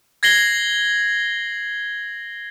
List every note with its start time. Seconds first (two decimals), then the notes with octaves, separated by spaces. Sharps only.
0.23 G#6 A#6 C7 F#7 G7